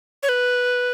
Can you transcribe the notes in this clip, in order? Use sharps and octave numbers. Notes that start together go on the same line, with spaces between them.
C#5
B4